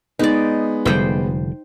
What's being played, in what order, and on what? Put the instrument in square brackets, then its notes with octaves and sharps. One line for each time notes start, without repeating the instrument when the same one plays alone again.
[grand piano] G#3 B3 [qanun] D#4 D5
[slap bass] F1 D3 G3 [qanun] C5 G5